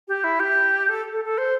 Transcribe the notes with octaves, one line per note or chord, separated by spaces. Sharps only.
G4
E4
G4
A4
A4
A4
C5